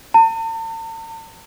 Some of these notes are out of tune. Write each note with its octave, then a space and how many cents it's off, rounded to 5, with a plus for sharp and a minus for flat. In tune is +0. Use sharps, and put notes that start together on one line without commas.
A5 +45